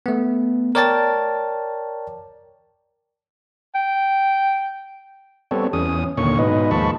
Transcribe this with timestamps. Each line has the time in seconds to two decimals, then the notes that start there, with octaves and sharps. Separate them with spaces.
0.06 A3 B3
0.75 A#4 C#5 D5 G5 A5 A6
3.75 G5
5.51 G3 B3 C4 A4 C#5
5.73 E2 C#4 D#6
6.17 D#2 A#2 D3 C#5 C#6
6.39 G#2 B2 D#4 B4 D#5
6.71 D#2 F3 G#3 A5 B5 C#6